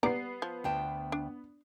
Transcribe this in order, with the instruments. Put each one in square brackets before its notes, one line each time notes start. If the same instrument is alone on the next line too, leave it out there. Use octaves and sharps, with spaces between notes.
[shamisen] G3 D5 A#5 [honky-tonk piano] B3 C7
[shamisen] F3
[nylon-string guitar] D2 G5 A5
[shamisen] D4